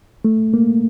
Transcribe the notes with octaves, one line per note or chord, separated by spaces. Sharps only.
A3
A#3